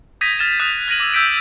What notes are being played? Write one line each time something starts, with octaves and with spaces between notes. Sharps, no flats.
D#6 G6 G#6 A#6 B6 D#7
F6 A6 A#6 E7
D#6 F#6 B6 E7
F6 G#6 A#6 D#7 F#7
D6 E6 G#6
E6 G6 A#6 B6 D7